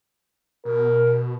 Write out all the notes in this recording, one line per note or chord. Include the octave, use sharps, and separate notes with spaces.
B2 A#4